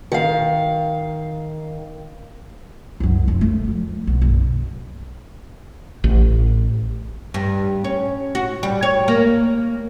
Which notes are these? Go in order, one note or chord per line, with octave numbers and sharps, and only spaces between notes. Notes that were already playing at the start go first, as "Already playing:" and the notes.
D#3 F5
C2 F#2
F1 F#2
A3
F2
B1
F#1
A1
G2
C#4
F#4
G3
C#5
A#3